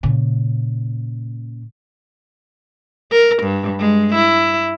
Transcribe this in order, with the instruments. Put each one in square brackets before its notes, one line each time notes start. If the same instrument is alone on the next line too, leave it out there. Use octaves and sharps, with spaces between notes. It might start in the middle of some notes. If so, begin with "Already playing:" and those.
[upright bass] A#2 C#3
[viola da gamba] A#4
G2
G#3
E4